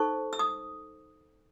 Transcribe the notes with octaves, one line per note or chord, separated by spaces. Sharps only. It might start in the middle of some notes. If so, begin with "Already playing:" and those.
Already playing: D#4 A4 C5 C#6
E6
D#6